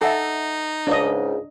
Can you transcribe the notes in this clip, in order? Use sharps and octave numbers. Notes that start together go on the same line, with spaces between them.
D#4 A4 E5 F#5 G#5
C#2 G#2 C#3 D4 D#5